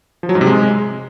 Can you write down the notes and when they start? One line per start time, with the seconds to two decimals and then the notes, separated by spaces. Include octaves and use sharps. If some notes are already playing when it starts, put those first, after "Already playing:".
0.23 F3
0.29 F#3
0.35 G#2
0.41 C3
0.47 G#3